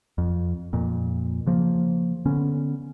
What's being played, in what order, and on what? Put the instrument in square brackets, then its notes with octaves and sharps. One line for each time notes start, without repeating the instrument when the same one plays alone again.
[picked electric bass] F2
F2 A#2
C#3 F3 A#3
D3 B3 C#4